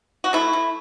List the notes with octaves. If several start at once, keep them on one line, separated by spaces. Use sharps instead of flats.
F#4
A3 E4
A3